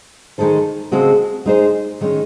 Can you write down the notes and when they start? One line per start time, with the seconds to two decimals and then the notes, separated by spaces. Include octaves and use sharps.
0.38 D#3 G#3 D#4 A4 C5
0.92 C#3 G#3 C4 F#4 A4
1.46 G#3 D#4 G#4 C5
2.01 D#3 G#3 C#4